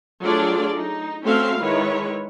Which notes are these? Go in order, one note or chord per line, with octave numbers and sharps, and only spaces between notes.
F#3 A3 D4 F4 G#4 D5
D#4
A3 C4 C#4 F#4 E5 F5
D#3 G#3 E4 B4 C#5